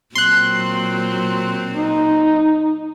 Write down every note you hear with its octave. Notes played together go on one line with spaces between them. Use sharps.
A#2 F#3 C4 C6 F#6
D#4